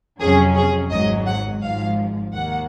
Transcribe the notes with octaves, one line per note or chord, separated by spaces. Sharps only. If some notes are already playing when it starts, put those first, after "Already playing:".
F2 C3 F#3 C#4 G#4
G#4
G#1 G#2 F#3 D#5
F#5
G#1 G#2 F3 F5
D#2 D#3 A#3 F#5